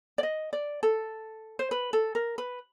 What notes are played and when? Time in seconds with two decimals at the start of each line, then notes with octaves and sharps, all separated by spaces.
0.18 D5
0.23 D#5
0.53 D5
0.83 A4
1.59 C5
1.71 B4
1.93 A4
2.15 A#4
2.38 B4